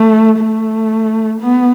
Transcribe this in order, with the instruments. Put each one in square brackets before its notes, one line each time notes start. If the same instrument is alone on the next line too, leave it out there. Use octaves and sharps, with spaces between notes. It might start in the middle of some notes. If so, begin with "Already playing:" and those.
Already playing: [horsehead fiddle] A3
A3
B3